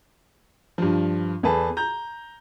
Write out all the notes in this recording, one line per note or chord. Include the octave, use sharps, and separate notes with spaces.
G2 F3
E2 G#4 A4 B4 A5
A#5 G6